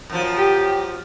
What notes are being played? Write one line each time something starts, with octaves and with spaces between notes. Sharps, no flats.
F#2 F3
G4